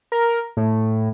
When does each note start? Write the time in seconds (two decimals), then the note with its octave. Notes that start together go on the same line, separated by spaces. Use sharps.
0.12 A#4
0.57 A2